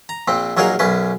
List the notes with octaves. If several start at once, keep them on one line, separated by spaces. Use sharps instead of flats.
A#5
A#1 A#2 C4
A#1 F#3 D#4 G#4 A#4 F5
B1 F#2 C#4 B4